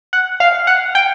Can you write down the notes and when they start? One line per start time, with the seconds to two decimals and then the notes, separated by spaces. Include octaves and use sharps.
0.13 F#5
0.40 F5
0.67 F#5
0.95 G5